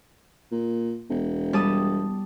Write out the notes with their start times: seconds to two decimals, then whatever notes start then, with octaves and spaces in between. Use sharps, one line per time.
0.52 A#2
1.10 E1
1.53 G3 A5 D#6